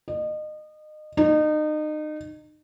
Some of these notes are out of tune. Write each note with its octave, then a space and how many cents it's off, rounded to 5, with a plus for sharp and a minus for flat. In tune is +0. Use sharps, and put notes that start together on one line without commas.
D#5 -30
D#4 -30